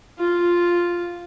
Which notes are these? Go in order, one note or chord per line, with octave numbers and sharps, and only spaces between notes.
F4